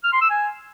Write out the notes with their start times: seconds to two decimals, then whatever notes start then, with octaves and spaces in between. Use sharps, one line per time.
0.04 F6
0.13 C6
0.21 E6
0.30 G#5